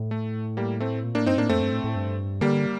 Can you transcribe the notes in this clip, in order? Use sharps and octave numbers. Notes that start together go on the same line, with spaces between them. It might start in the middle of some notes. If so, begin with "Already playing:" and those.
Already playing: A2
A3
G3 A#3
A3 C4
A#2
A2 A#3 D4
G2 C4 D#4
A2 A#3 D4
F2 A3 C4
G2
A2
A2
G2
D3 G3 A#3